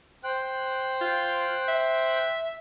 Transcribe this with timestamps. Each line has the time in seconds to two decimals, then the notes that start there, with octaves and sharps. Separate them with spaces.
0.24 C5 G5 F#6
1.01 F4
1.68 E5